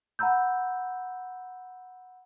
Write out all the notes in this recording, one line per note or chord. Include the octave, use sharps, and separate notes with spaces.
F#5 A#5 B5 E6 G6